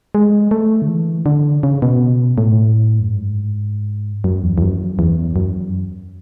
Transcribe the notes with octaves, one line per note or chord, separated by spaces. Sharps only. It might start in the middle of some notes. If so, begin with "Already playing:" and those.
G#3
A3
D3
E3
D3
C#3
B2
A2
F#2
G#2
F#2
E2
E2
F#2
E2
F#2